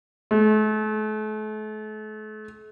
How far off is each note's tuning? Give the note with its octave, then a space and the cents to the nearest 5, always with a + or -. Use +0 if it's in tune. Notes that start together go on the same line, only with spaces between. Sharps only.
A3 -40